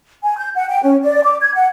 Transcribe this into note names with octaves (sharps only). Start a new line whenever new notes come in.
G#5
G6
F#5
G5
C#4
D5
D6
G#6
F#5